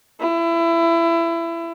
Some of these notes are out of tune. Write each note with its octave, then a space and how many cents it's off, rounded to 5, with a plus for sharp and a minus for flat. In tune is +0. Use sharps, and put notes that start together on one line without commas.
E4 +25